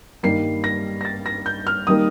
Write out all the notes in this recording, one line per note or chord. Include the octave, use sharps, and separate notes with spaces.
G2 D#3 G3 A#3 C7
A#6
A#6
A6
A#6
G6
F6
D#3 G3 A#3 D#6